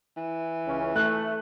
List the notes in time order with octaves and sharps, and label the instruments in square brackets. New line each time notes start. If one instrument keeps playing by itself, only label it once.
[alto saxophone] E3
[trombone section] C#2 C#4
[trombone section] A3 [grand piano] F#6